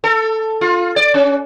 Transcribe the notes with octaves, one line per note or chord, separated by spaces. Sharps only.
A4
F4
D5
C#4